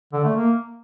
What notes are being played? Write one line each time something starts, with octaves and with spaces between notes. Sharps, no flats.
D3
A3
A#3